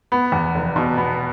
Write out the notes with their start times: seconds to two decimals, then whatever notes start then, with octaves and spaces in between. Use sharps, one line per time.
0.12 B3
0.32 E2
0.55 F1
0.76 B2
0.97 B3